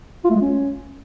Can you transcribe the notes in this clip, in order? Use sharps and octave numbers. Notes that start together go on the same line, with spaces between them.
F4
A3
G#3
C#4